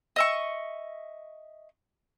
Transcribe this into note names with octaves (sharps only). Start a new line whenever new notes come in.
D#5 E5 C#6